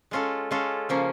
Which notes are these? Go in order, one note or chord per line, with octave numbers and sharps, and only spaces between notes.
G#3 C#4 F4 A4
G#3 C#4 F4 A4
C#3 F3 A#3 C#4